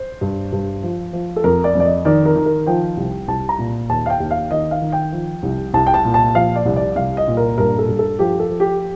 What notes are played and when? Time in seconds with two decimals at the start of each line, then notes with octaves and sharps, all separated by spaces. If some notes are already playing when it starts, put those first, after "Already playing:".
Already playing: C5
0.21 G2
0.52 G2
0.83 F3
1.13 F3
1.36 A4
1.44 F2 A#4
1.64 D5
1.75 F2 D5
1.85 D#5
2.05 D#3 D5
2.25 A#4
2.36 D#3
2.46 A#4
2.66 F3 G5
2.97 C2
3.28 C2 A5
3.49 A#5
3.58 A#2
3.89 D#2 A5
4.06 F5
4.10 G5
4.20 D#2
4.31 F5
4.51 D#3 D#5
4.71 F5
4.82 D#3
4.92 G5
5.12 F3
5.43 C2
5.74 C2 A5
5.87 G5
5.94 A5
6.05 A#2
6.14 A5
6.35 F3 F5
6.56 D5
6.65 C2
6.76 D5
6.96 C2 F5
7.17 D#5
7.28 A#2
7.37 A#4
7.58 G2 A#4
7.79 A4
7.88 G2
7.99 A4
8.19 F3 G4
8.40 A4
8.50 F3
8.60 G4